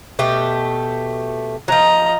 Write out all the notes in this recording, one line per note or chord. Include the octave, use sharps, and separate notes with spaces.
B2 A3 G4
F3 F#3 D#5 A#5